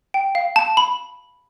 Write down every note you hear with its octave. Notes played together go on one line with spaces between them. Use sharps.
G5
F5
A5
B5